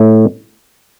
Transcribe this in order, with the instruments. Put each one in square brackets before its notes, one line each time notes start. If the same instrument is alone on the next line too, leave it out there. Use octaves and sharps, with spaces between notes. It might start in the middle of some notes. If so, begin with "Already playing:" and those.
Already playing: [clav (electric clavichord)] A2 A3 A4